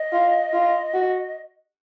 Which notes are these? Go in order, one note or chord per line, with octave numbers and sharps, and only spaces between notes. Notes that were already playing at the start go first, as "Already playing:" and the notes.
Already playing: D#5
F4
F4
F#4